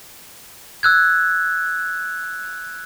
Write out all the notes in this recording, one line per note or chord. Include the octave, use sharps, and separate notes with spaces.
E6 F#6 G#6